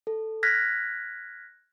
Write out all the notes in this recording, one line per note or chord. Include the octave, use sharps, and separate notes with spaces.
A4
F6 F#6 G#6 A#6 B6